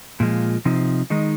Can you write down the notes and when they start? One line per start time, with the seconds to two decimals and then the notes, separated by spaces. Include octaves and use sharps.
0.20 A#2 F3 G#3
0.65 C3 F3 C4 D#4
1.10 D#3 G#3 D#4